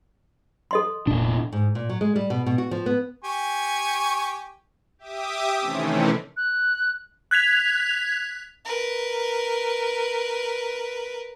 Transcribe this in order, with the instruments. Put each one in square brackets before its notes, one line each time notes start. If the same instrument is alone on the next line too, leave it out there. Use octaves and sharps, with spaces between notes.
[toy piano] A4 D#5 C6
[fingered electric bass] F1 D4 [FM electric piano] A#2
[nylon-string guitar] G#2
A#2
F#3
G#3
G3
B2
B2
F#4
F3
B3
[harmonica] G4 G#5 C#6
[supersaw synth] G4 E5 D6 D#6
C3 D#3 E3 A3 C4 C#4
[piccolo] F#6
[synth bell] F#6 G#6 B6 F7
[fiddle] A#4 B4